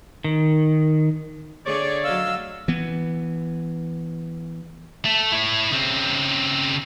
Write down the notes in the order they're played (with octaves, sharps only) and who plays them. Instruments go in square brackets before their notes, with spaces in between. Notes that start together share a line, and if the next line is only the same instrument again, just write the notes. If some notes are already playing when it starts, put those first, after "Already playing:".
[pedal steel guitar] D#3
[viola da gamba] D3 A3 G#4 [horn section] C#5 D5
[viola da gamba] F#3 D#5 [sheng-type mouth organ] F5 E6
[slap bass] E3 B3
[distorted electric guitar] A3
E4 C#5
C#3 C4